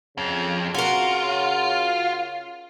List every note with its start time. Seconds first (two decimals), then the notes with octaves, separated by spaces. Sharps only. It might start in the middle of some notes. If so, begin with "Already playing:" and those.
0.18 F2 C#3
0.75 F4 F#4 A#4